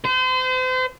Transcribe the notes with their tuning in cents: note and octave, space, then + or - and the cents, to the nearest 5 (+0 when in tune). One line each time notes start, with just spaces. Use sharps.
C5 -35